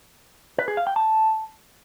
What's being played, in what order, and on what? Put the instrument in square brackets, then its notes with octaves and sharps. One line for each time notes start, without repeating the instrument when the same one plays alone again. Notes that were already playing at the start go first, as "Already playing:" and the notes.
[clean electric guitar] B4
G#4
F5
G5
A5